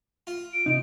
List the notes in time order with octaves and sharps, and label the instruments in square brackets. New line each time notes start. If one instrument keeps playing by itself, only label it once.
[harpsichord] F4
[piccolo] D7
[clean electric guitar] C3 D#4